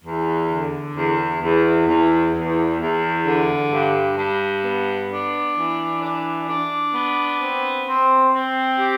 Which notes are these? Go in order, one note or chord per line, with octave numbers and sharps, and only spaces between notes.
E2
D3
E2
E2
E2
E2
E2
D3
G2
G2
B3
D4
E3
D4
D4
B3
C4
C4
C4
G4